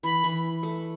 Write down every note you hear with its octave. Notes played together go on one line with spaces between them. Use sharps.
E3 B5
E3
A3